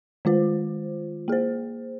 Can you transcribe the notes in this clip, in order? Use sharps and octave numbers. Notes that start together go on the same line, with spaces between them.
D#3 G#3 F4 C5
A#3 G#4 C5